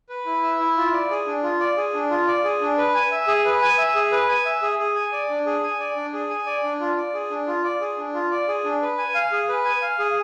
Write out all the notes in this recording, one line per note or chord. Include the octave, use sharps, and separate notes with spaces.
B4
E4
E5
E4
F4
D5
G#4
D4
F4
D5
G#4
D4
F4
D5
G#4
D4
B4
G#5
E5
G#4
B4
G#5
E5
G#4
B4
G#5
E5
G#4
G#4
G#5
D5
D4
G#4
G#5
D5
D4
G#4
G#5
D5
D4
F4
D5
G#4
D4
F4
D5
G#4
D4
F4
D5
G#4
D4
B4
G#5
F5
G#4
B4
G#5
F5
G#4